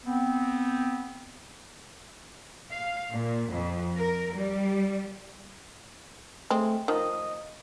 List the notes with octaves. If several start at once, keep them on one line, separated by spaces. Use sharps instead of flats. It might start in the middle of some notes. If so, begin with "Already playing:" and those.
B3 C4
F5
A#2
F2
A#4
G3
G#3 A3 C4
D#3 F3 D#5